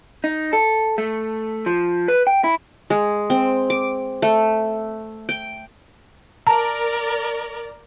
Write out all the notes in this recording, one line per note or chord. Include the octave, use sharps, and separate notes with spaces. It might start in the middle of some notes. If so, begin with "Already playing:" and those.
D#4
A4
A3
F3
B4
G5
E4
G#3
C4
D6
A3
G5
A#4 D5 A5 A#5